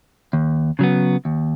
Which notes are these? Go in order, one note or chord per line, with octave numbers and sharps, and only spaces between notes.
D#2
C#3 F#3 B3
D#2